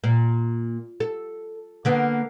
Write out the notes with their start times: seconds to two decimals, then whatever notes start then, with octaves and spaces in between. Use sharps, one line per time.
0.04 A#2
1.00 A4
1.85 D3 A#3 B3